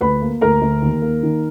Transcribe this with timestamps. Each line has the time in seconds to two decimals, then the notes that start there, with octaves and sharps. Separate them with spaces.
0.01 D2 B4 B5
0.22 A#3
0.41 D2 A#4 A#5
0.62 D2
0.82 D#2
1.02 A#3
1.23 D#3